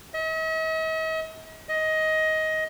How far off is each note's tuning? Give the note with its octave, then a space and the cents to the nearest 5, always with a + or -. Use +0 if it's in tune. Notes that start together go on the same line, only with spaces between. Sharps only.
D#5 +45
D#5 +15